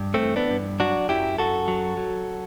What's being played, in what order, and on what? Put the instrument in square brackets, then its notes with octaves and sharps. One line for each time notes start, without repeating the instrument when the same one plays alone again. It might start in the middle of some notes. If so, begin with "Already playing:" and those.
Already playing: [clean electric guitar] G2
A3 C4
E3
B3 D4
G2
F#3 D4 F#4
F#2 E4 G4
F#2 F#4 A4
F#3
F#3